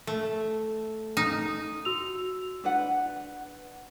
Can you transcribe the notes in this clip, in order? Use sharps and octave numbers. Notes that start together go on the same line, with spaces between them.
A3
D#4
F#4 E6 F7
D4 B4 F#5